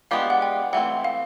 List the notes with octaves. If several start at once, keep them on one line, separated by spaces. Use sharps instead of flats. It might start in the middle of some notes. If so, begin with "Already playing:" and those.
G#3 B3 D4 G4 F5
F#5
G5
E3 A3 C4 F#5
F5